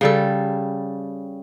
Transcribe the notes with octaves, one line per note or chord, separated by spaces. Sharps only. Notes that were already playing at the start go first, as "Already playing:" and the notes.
C#3 G3 A4